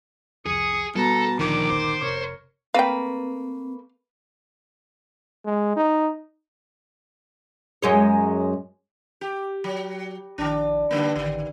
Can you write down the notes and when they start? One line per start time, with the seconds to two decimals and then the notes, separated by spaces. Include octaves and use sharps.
0.46 C2 F2 G#4 D#6 C#7
0.96 B2 G3 A4 A5 A#5
1.39 D2 A#2 D#3 F3 D6
1.70 G1 D2 A#2 C5
2.02 F1 C3 A#4 C#5
2.74 A3 A#3 C4 B4 F5 G5
5.45 G#3
5.76 D#4
7.82 F#2 G#3 C#5
9.21 G4
9.64 F#3
10.38 A#1 D#3 D4
10.91 G2 D3 A#3
11.15 A1 D3 D#3